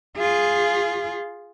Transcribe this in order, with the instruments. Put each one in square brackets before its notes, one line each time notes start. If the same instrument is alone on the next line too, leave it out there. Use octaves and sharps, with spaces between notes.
[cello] F4 G#4